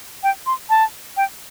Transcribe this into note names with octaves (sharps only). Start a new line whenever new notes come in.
G5
C6
A5
G5